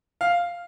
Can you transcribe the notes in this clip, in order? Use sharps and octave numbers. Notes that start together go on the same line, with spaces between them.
F5